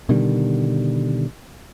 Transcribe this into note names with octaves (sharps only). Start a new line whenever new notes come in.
B2 D3 D#3 G3